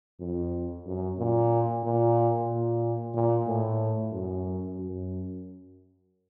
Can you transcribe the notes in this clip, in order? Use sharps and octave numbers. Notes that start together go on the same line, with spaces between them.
F2
F#2
A#2
A#2
A#2
A#2
A2
F#2
F#2